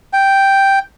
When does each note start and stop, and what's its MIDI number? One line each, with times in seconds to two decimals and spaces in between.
0.13 0.79 79